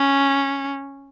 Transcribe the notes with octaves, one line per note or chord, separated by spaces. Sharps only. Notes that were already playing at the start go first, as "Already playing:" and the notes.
Already playing: C#4